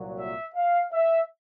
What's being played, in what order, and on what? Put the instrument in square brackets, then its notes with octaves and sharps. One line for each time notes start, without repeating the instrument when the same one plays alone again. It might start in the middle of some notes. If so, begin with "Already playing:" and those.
Already playing: [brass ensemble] C2 A#2 F#3
E5
F5
E5